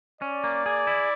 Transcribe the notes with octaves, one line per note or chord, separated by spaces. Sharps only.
C#4 D5
A#3
G#4
E4